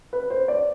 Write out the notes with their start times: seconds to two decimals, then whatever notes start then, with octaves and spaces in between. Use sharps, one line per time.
0.13 B4
0.30 C5
0.48 D5